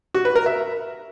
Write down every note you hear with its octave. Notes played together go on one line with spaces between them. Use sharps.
F#4
B4
A#4
E5